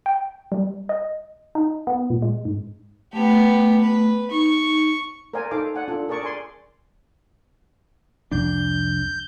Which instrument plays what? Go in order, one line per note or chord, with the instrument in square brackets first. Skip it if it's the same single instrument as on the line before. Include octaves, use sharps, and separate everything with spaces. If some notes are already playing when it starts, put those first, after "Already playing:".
[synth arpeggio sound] G5
G3
D#5
D#4
B3
A#2
G#3
G#2
[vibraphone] A3 [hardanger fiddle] B3 G4
[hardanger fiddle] B4
[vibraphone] D#4 [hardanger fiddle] C#6
[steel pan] A#4 C5 D5 F5 G#5
D#4 A4 C5 F5 G#5 D6
D5 F#5 G#5
D4 F4 A4
G#4 A#4 D5 A5 C#6
D5 G#5 C6
[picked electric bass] C2 F2 D4 [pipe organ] G6